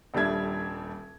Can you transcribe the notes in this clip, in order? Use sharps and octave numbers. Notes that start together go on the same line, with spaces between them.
D#1 G3 A3 D4 E5 G#6